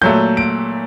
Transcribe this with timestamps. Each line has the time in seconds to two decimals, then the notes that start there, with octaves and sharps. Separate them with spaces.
0.01 A#2 F#3 A3 G6
0.37 D7